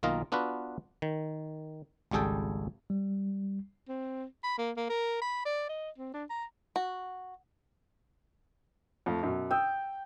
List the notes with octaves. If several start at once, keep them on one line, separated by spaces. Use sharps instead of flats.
B1 D#3 A#3 F4 D#5
B3 D4 F4 F#4 B4
D#3
G#1 C#2 G3 G#4 A4 G5
G3
C4
B5
A#3
A#3
A#4
B5
D5
D#5
C4
D4
A#5
F#4
F2 A3
F#2 B2
G5 D#6 E6